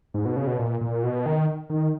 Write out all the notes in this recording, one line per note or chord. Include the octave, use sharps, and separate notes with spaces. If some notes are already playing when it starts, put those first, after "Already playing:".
G#2
B2
C#3
B2
A#2
A#2
B2
D#3
D#3